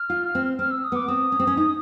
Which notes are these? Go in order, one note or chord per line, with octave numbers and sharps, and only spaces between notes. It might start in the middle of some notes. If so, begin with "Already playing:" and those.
Already playing: F6
F4
C4
C4 F6
E6
D#6
B3 D6
C4 D#6
C#4
C4
C#4
D#4